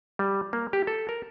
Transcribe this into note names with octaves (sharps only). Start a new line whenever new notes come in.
G3
A#3
G4
A4
A#4